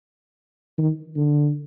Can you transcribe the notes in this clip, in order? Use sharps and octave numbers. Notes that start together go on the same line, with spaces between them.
D#3
D3